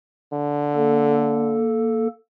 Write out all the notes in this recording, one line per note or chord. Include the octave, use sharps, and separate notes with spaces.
D3
A#3 A4